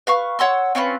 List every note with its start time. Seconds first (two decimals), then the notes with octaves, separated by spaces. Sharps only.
0.07 B4 F5 C#6
0.39 C#5 F#5 C6 E6
0.75 C4 C#4 F4 B4